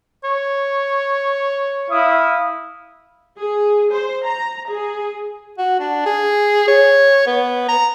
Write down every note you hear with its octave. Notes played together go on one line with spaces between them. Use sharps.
C#5
E4 F5 D#6
G#4
C5
A#5
G#4
F#4
D4
G#4
C#5
B3
A#5